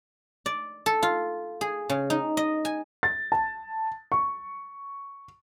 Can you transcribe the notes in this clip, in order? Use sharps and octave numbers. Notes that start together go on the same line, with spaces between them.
D5
A4
F4
G#4
C#3
D#4
D#5
G#5
A6
A5
C#6